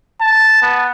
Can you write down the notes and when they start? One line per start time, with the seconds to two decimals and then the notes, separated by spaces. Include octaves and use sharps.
0.21 A5
0.62 B3